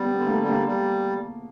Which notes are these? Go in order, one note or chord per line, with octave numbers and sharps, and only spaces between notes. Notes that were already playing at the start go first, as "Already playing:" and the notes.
Already playing: G3 B3
B3
D3
A#3
A3
G3
A#3
G3